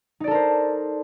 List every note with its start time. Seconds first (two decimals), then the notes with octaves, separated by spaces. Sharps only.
0.20 D#4
0.24 D5
0.28 A4
0.31 A#4
0.35 C5